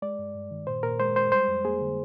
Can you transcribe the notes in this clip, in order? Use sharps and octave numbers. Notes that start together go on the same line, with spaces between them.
G#3 D5
G2
G2
D#3
A#2 C5
A#2 A#4
G#3 C5
G#3 C5
G3 C5
F2
A#3 G#4
D3